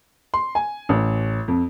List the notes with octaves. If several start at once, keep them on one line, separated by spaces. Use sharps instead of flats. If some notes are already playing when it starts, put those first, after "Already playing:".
C6
G#5
A1
F2